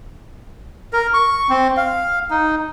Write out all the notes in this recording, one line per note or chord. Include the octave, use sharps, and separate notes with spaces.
A#4
C#6
C4
F5
D#4